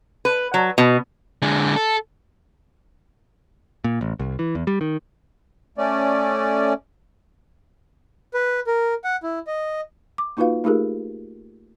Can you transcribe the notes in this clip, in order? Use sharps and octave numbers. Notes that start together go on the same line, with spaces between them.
B4
F#3
B2
D3 G#3
A4
A#2
A1
C2
E3
E2
G3
D#3
A3 C#4 D5
B4
A#4
F#5
E4
D#5
D6
A#3 D#4 F4 F#4 B4 F5
A3 D#4 F4 G4 G#4 A#4